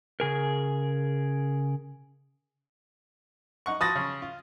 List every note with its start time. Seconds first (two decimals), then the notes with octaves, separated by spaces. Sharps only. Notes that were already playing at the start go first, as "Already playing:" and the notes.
0.20 C#3 G#4 A#4
3.66 D#4 F#5 C#6
3.81 F3 F#4 B5 D#6 A6 A#6
3.95 C#3
4.22 F4